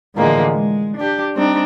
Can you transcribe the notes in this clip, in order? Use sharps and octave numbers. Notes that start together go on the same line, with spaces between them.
A2 D3 E3 F3 G#3 A#3
G#3
D4 G4
G3 C4 D4 D#4